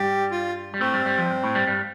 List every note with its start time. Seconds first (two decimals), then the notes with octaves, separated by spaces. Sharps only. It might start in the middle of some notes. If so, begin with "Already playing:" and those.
Already playing: G2 G3 G4
0.31 F4
0.74 G3
0.81 A2 A3 C4
0.93 G2 G3
1.05 G2 G3
1.17 F2 F3
1.31 G2
1.44 A2
1.55 G2 G3
1.67 G2 G3